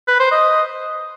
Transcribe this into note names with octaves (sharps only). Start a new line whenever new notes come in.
B4
C5
D#5